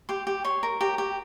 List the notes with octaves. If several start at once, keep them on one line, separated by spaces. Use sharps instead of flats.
G4 C6
G4
C#5 C6
A#4
G4 A#5
G4